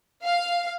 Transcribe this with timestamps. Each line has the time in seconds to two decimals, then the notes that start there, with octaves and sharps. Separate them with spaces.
0.24 F5